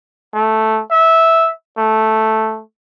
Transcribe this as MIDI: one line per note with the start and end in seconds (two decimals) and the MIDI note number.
0.34 0.81 57
0.91 1.51 76
1.78 2.61 57